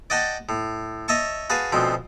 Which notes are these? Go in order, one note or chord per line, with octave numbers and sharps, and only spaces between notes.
D5 D#5 F#5 G5 A5
A2
C#5 D#5 E5 A5 C#6
F#4 G#4 B4 F5 A5
D2 B2 F3 C4